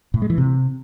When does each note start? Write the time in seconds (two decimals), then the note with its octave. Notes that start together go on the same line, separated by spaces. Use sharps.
0.14 A2
0.22 G#3
0.30 E3
0.38 C3